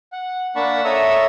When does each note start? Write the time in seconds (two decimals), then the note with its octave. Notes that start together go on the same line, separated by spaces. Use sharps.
0.12 F#5
0.56 A#3 D4 F#5 A5 B5 C#6
0.85 A4 C#5 E5 A#5 D#6 E6